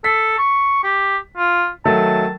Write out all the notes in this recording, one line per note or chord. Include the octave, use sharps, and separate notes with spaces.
A4 B6
C#6
G4
F4
D#3 F#3 A3 A5